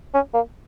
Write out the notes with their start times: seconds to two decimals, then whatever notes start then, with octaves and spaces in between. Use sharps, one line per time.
0.14 C#4
0.34 A#3